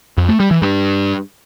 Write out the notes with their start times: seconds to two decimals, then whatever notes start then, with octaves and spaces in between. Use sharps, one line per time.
0.17 F2
0.29 A3
0.40 G3
0.51 E3
0.62 G2